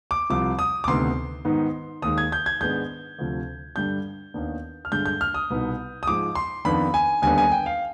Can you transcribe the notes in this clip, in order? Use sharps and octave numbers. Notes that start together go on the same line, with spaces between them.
D6
C2 C3 F3 D6
D#6
D6
D2 C3 D#3 B3 D#4 C6
G#2 D#3 B3 D#4
D#2 D#3 G#3 D#6
G#6
G6
G#6
G#2 D#3 G#3 B3 D4 G6
D2 C3 F3
G2 D3 G3 D4 G6
D#2 D#3 B3 D4
F6
G2 D3 G#3 G6
G6
F6
D#6
C2 B2 B3 D#4
D#6
G#2 F3 G#3 D6
C6
F2 D#3 B3 D4 B5
G#5
D#2 D3 G3 B3 D4 G#5
G#5
G5
F5